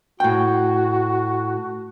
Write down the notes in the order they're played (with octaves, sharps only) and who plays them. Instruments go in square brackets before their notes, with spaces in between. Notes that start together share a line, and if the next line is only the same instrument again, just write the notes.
[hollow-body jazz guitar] A2 G5 [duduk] F#4